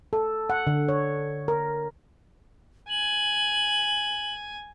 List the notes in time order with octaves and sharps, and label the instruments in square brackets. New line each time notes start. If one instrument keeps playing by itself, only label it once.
[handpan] A4
F#5
D3
C#5
A#4
[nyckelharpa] G#5 [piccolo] F#7